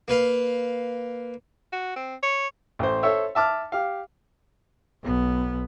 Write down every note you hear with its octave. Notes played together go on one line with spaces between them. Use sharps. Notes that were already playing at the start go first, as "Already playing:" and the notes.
A#3 B4 F5
F#4
C4
C#5
A1 C5
A4 C5 C#5 E5
E5 A5 D6 F6
G4 F5
B1 B3